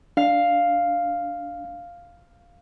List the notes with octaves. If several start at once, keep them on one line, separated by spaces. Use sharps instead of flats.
D4 F5